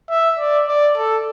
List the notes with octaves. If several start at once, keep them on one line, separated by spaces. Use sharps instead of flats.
E5
D5
D5
A4